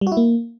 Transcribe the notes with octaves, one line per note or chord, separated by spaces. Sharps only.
G3
F#4
E4
A#3